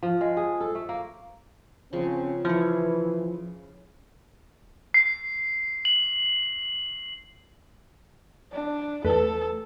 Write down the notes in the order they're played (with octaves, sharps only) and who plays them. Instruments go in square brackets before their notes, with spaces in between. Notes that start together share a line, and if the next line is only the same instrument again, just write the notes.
[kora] F3
G#3
G#4
A4
A3
A#3
[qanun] C#3 F3 [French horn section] C4 C#4
[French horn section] E3 [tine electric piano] F3 [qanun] E4 C#5
[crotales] C7
F#7
[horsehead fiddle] D4
[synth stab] E2 A3 B4 [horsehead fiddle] A4